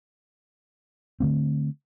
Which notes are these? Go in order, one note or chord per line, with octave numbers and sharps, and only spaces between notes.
D3 A3 C4